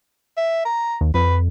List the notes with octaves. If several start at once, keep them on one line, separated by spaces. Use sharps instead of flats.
E5
A#5
D#2
F2 B4